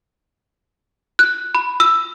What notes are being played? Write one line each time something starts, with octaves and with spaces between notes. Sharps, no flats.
F#6
B5
E6